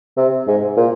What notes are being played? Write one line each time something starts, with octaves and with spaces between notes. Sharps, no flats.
C3
G#2
A#2